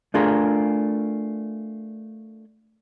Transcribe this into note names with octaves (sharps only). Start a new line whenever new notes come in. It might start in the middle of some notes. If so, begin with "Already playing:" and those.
A3 D4 F4 G#4 A#4